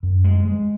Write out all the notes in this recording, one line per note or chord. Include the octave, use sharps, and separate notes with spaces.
F#2
G#3
G#3